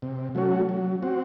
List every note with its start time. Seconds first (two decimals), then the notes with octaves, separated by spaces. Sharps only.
0.02 C3
0.35 F#3 A3 C#4 F#4
0.69 F#3
1.03 C4 F#4